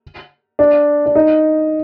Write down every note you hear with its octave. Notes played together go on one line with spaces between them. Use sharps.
D4
D4
D#4